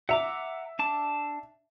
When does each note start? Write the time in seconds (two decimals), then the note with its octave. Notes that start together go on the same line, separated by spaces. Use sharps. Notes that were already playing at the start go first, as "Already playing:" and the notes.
0.09 E5 F#5 A#5 D6
0.79 D4 A5 D6